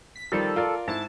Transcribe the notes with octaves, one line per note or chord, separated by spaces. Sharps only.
B6
D#3 F3 G3 A4
F4 A#4 D5
G#2 E4 A5